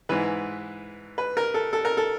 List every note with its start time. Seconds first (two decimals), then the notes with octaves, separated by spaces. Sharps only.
0.09 G#2 E3 B4
1.18 B4
1.37 A#4
1.54 A4
1.73 A4
1.85 A#4
1.97 A4